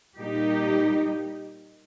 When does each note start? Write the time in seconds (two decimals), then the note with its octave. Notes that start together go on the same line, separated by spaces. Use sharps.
0.17 A#2 G3 A#3 D#4 G4